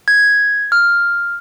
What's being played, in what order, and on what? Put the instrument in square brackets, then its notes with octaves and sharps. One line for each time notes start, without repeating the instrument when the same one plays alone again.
[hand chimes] G#6
F6